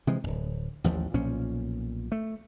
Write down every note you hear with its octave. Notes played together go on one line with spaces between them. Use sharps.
C3 E3 F3 G#3
D1 G#1
A1 D#2 F3
B1 A#2 F3 C#4
A3